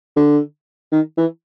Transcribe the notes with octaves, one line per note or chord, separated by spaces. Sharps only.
D3
D#3
E3